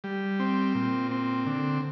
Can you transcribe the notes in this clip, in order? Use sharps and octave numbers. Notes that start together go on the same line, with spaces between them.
G3
C4
A#2
C4
D3